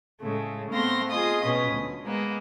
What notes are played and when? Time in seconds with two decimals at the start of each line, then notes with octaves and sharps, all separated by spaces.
0.22 A2 C#3 G#3 A3
0.72 A3 B3 C4 F5 C6 A#6
1.10 F4 G#4 D#5 C6 D#6
1.45 B2 C#4 B4
1.75 D2
2.05 G#3 A#3 B3